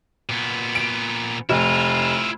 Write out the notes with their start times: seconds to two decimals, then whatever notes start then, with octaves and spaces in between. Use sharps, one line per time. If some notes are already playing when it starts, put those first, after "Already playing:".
0.29 A#2 B3
0.75 D7
1.50 F1 E4 F4